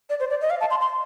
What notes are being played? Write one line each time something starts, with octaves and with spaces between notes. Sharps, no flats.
D5
C5
D5
D#5
F5
A5
C6
C6